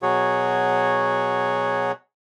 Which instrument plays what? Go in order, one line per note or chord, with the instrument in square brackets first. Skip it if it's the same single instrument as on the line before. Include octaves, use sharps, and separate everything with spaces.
[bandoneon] B2 F#3 F#4 G#4 C#5